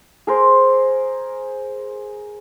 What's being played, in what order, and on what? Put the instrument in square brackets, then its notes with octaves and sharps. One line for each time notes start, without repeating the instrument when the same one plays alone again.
[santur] G#4 A#4 C5